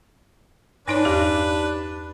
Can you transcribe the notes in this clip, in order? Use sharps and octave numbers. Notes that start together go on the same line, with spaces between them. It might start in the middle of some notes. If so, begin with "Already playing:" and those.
G2 D4 D#4 B4 C#5
E2 G4 D6